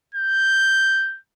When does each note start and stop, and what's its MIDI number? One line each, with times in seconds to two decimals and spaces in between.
0.15 1.18 91